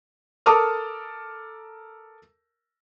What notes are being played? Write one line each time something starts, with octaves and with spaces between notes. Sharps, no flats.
A4 A#4 A5 D6 D#6 F6